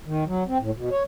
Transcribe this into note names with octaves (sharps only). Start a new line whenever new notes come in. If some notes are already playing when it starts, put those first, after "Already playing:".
D#3
F#3
C4
A2
B2
C#5